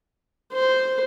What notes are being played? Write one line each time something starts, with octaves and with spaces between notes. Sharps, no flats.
C5